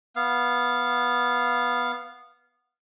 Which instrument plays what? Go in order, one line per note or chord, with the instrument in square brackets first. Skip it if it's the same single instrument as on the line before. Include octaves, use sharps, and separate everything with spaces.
[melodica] B3 F5